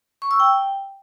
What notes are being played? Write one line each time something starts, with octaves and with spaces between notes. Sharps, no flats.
C#6
E6
G5